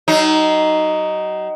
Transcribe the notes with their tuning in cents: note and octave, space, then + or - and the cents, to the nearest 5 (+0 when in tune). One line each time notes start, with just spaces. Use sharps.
F#3 +40 D#4 +0